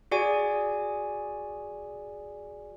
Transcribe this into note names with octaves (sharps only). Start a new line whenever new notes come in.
F#4 G#4 D5 G#5